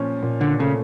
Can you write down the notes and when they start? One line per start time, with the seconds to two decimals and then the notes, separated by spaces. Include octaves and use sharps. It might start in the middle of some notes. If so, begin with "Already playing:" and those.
Already playing: A#2 F3 C#4
0.23 A#2
0.41 D3
0.59 C#3 A3